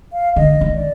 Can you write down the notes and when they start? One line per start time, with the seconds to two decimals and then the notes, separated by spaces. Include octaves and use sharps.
0.13 F5
0.36 D3 D#5
0.61 D#3
0.73 D5